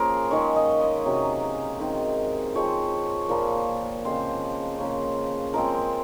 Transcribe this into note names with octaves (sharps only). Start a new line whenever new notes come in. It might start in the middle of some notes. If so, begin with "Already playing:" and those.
Already playing: F3 A#3 C#4 G#4 A#4 C5
D#3 G#3 C#4 C#5
D#5
D#5
C3 F#3 C#4
D#3 G#3 C4
F3 G#3 C4 C#5
A#2 F3 A#3
C#3 G#3 C4 C5
C#3 F3 A#3 C#4
F3 G#3 C4 A#4